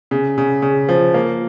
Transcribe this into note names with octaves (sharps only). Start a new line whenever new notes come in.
C#3
C#3
C#3
F3
A#3